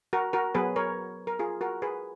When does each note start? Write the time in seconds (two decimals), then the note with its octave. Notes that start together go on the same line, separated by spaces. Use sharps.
0.13 F#4 A#4
0.33 F#4 A#4
0.55 F#3 B3 G#4 B4
0.76 A#4 C#5
1.27 A#4
1.39 F4 G#4
1.61 F#4 A#4
1.82 G#4 B4